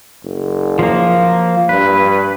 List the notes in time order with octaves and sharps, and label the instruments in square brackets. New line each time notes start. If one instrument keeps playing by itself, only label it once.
[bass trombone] F#1
[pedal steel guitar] F3 A#3
[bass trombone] G2 [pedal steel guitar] B4